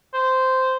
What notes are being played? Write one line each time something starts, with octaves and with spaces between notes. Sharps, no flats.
C5